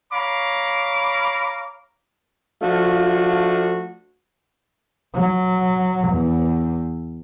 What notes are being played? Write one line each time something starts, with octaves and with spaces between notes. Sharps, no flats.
C#5 F5 A#5 B5 D6
F3 A3 D4 F4 F#4
F#3
E2